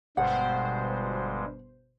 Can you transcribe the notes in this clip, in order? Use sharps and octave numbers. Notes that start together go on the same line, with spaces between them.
G1 G2 B2 G3 G#3 C5 F#5